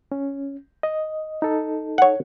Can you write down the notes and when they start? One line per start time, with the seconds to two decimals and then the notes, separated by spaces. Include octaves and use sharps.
0.12 C#4
0.83 D#5
1.42 D#4 A4
1.98 C#5 F#5